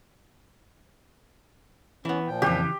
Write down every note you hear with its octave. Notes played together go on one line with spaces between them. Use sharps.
E3 B3 C#4
A#2 F3 G5
B1 F2 C#3 E3 G4